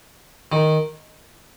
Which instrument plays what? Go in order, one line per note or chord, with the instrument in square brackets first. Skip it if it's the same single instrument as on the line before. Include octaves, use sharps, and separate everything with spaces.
[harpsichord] D#3